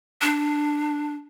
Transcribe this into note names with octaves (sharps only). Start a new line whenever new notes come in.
D4